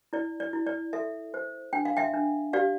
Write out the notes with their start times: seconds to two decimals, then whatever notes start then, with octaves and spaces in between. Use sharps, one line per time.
0.13 E4 D5
0.40 D5
0.53 E4
0.67 D5
0.93 A4 E5
1.34 C5
1.73 D4 G5
1.85 F5
1.97 E5 G5
2.14 D4
2.53 G4 D5 F5